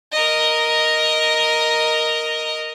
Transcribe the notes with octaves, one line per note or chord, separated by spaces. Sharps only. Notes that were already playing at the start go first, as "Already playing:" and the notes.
A#4 D#5